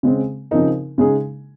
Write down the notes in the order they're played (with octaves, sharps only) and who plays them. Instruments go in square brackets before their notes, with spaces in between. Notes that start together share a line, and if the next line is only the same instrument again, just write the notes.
[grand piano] C#3 G#3 C4
C#3 F3 C4 D#4 A#4
C#3 G#3 D#4 G#4